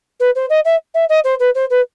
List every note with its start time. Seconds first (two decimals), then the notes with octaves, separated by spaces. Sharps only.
0.20 B4
0.35 C5
0.50 D#5
0.65 E5
0.94 E5
1.09 D#5
1.24 C5
1.40 B4
1.55 C5
1.70 B4